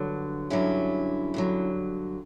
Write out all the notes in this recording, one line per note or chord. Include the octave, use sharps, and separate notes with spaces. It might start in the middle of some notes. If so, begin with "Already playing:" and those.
Already playing: G2 D3 F#3
G2 D3 F#3 C#4 E4
G2 D3 F#3